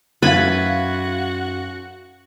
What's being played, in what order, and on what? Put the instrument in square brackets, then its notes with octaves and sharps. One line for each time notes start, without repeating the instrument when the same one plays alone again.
[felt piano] F#2 [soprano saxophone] F#4 [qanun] B4 E5 B5 [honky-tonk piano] F5 G#6 A6